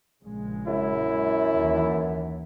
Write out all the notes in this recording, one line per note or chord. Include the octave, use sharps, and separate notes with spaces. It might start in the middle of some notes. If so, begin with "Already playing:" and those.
A#1 C#3 G#3
F#2 E4
D#2 E3